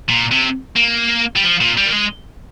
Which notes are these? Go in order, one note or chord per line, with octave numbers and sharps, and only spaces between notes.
A#2
C3
A#3
G3
F3
A#2
G3
A#3
G#3